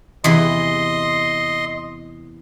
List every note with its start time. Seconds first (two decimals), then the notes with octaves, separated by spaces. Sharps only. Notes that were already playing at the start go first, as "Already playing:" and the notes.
0.24 E2 C3 E3 D#5 C6